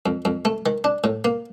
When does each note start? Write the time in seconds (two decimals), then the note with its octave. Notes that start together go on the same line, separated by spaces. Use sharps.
0.06 F2
0.25 F2
0.45 A3
0.66 D#3
0.84 D4
1.04 A2
1.24 A#3